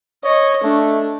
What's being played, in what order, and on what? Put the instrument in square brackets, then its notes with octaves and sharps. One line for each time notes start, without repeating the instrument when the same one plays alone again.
[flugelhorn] C#5 [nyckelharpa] D#5
[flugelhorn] A3 [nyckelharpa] D4